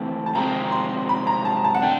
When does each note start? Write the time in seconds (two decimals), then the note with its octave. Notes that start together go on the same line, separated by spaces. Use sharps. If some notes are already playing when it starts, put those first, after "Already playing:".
Already playing: E3 A3 C4 G5 A5
0.26 A5
0.35 C3 F3 G#3 C4 A#5
0.72 C6
1.09 B5
1.27 A#5
1.45 A5
1.64 A5
1.74 F#5
1.82 A3 D4 G5